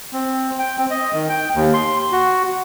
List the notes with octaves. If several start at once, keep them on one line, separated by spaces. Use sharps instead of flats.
C4
G5
C4
D#5
D#3
G5
D#2
C6
F#4